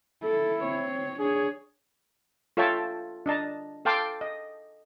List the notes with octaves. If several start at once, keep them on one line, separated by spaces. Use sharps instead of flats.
E4 A4
C4 C#5
D4 G#4 C#5
F4 A4 C#5 E5 G5 A5
D4 D#5 A5 A#5
A4 F5 G5 A5 C6 D6
D#5